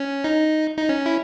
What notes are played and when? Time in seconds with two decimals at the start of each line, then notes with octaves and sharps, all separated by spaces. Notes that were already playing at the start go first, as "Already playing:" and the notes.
Already playing: C#4
0.24 D#4
0.78 D#4
0.89 C#4
1.06 E4